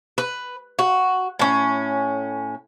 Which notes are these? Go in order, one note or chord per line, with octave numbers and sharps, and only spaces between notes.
B4
F#4
A2 C#4